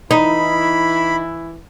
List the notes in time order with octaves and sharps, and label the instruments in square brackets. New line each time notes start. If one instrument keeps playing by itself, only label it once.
[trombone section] E3 E4 [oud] D#4 [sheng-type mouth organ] B5